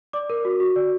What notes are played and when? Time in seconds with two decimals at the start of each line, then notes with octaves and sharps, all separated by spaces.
0.13 D5 D6
0.30 A#4
0.45 F#4
0.60 F#4
0.76 D5